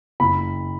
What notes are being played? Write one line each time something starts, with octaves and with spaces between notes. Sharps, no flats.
F#1 B5